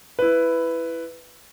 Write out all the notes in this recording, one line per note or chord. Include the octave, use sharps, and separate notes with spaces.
E4 B4